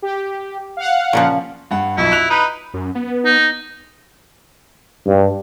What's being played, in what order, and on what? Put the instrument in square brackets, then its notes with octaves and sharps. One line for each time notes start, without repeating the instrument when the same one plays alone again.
[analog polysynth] G4
F5 F#5
[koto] A#2 C#3 F3
[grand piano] G2 F#5
[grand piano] B1 F2 [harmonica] E4
[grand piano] F#6 F7
[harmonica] D#4 B4
[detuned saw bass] F#2
B3
[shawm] D#4
[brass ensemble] G2